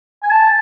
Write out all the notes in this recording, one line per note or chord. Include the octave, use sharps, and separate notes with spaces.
G#5
A5